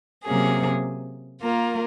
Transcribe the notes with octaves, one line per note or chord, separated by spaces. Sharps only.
C3 F#3 A#3 C#4 G#4
A#3 F4 A#4